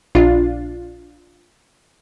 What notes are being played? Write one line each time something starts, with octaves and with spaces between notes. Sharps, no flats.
A#1 D4 F4